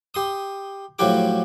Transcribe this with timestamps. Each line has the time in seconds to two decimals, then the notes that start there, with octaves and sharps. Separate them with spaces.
0.14 G4 C6 D#6
0.99 A2 F3 F#3 F#4 G4 D6